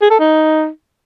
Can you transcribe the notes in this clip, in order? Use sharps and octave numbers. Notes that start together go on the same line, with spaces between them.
G#4
A4
D#4